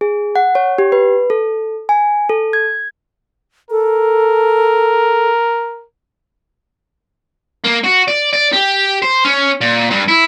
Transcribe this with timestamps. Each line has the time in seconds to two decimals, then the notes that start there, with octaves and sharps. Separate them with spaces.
0.01 G#4
0.36 F#5
0.55 C#5
0.78 G4
0.92 B4
1.30 A4
1.89 G#5
2.29 A4
2.53 G#6
3.71 A4 A#4
7.64 A#3
7.84 F#4
8.08 D5
8.33 D5
8.52 G4
9.02 C5
9.25 C#4
9.61 A#2
9.90 G2
10.08 E4